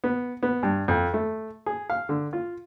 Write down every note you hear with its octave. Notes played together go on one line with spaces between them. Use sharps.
B3
B3
G2
F2
A3
G#4
F5
D3
F4